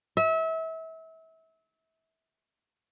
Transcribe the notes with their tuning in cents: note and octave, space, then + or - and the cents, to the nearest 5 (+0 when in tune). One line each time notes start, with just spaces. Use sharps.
E5 -30